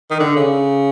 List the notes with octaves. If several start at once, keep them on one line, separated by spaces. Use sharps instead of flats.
D#3
D3
C#3